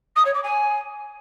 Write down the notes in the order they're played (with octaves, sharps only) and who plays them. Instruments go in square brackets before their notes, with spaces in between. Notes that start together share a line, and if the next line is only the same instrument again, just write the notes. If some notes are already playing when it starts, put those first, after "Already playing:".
[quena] D#6
C#5
D6
G#5